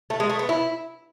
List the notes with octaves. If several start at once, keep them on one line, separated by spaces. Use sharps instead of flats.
A3
G#3
A3
B3
E4